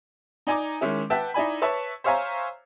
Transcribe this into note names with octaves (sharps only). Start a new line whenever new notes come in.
D#4 D5 G#5 A#5 D6
D#3 G#3 C#4 E4
B4 E5 F#5 G5 A5
D#4 E4 D5 G#5 B5
B4 C#5 E5 A5 C#6
C5 C#5 E5 F5 G#5 A#5